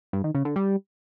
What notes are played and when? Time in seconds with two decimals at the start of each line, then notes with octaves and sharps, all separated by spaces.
0.13 G2
0.24 D#3
0.35 C#3
0.45 D3
0.56 G3